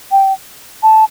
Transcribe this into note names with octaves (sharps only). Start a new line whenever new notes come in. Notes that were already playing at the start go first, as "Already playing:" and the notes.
G5
A5